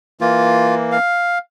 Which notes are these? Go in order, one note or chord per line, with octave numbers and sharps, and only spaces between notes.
E3 A#3 F4
F5